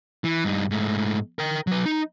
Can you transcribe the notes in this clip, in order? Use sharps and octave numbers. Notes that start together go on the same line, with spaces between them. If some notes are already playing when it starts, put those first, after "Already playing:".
E3
G2 D#4
G#2 A3
A#4 G5
F#3 B4
D#4